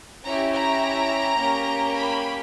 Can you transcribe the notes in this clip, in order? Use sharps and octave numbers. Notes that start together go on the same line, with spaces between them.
C#4 E4 G4 A#5
A#5
A#3 C#4 G4
B5